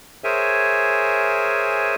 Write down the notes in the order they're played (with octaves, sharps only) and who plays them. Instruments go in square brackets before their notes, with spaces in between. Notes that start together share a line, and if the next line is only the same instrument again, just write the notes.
[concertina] G#4 A#4 C5 C#5 E5 G#5